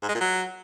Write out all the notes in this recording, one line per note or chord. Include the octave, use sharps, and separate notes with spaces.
G#2
G#3
A#2
F#3